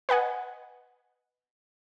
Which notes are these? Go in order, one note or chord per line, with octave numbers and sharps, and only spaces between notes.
B4 D#5 F#5 G#5